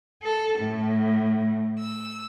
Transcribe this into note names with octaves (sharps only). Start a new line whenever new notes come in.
A4
A2
E6